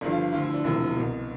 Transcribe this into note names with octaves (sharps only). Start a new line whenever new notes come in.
G1 G2 D3 F3 D4
F4
D2 D3 F3 F4
E4
D4
E1 D2 C3 F3 E4
C2 B2